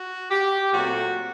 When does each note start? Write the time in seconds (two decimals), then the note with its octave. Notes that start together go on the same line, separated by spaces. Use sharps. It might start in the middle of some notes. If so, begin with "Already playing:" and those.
Already playing: F#4
0.31 G4
0.73 A#2 F#3 A3 C4 F#4